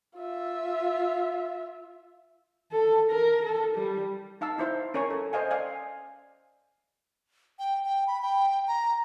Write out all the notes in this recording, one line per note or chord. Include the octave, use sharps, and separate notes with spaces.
F4 E5
A4
A#4
A4
G3
D#4 F5 A5 E6
D#4 E4 C5 F5
C#4 A#4 C#5 G#5 C#6
A4
C5 D#5 F5 G#5
D5 F5 G#5
G5
G5
B5
G5
A#5